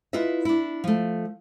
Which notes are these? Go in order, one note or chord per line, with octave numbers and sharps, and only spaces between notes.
E4 F4 B4 D#5 E5
D4 E4
F3 A3